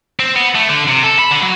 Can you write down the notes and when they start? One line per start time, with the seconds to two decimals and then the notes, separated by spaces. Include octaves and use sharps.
0.19 C4
0.36 B3
0.55 A3
0.69 D3
0.88 C3
1.04 A4
1.19 B5
1.31 D3
1.43 F#3